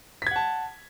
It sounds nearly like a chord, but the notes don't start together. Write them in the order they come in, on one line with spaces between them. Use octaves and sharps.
B6 G#6 F#5 A5